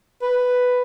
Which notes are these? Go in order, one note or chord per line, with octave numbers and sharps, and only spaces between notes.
B4